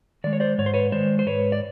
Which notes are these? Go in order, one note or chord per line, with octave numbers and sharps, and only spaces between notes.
D#3 G#3 D5
C#5
C5 D5
G#2 C#5
C5
B4 C#5
D#3 G#3 C5 D5
C5
G#2 B4 C#5
D5